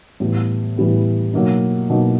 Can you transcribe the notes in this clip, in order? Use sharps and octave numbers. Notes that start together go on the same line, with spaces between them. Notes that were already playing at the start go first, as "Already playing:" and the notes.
A2 E3 G3 B3
A2 E3 G3 B3
B2 F#3 A#3 D#4
B2 F#3 A#3 D#4